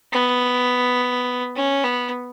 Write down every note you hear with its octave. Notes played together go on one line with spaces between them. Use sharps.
B3
C#4
B3